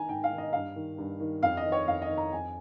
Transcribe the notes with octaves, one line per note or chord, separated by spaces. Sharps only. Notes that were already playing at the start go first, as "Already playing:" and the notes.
Already playing: D#3 G#5 A#5
G#2 G5
F5
D#3
D#5
G2 F5
D#3
G2
D#3
F2 F5
D#5
D#3
C#5
F2 F5
D#5
D#3
A#5
F2 G#5